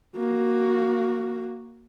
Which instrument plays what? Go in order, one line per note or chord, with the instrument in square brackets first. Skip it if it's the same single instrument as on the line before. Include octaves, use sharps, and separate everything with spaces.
[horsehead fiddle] A#3 F#4